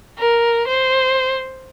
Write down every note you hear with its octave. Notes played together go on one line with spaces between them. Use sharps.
A#4
C5